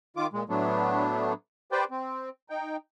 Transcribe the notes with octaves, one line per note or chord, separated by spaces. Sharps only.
D#3 F4 D6
A#2 G#3
A2 F#3 A3 B3 D4
G4 B4 C5 D5 G5
C4
D#4 G5